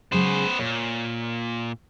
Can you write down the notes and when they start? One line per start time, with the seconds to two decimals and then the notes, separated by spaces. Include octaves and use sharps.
0.12 C#3 F#3 G#3 B3 C5
0.59 A#2 C#5